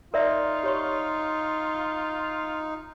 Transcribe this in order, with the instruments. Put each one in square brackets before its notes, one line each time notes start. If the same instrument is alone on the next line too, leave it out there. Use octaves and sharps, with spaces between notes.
[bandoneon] D#4 [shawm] F4 [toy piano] A#4 D5 E5
[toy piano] G4 C#5 C#6